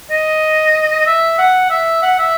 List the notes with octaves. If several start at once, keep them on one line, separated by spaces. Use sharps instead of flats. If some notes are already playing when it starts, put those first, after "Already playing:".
D#5
E5
F#5
E5
F#5
E5